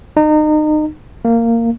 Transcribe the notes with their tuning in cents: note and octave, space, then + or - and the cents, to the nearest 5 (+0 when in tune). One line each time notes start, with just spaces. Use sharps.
D#4 -30
A#3 -15